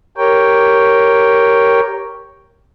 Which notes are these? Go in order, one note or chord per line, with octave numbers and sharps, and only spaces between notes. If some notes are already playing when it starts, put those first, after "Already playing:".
G4 A#4 C#5 G5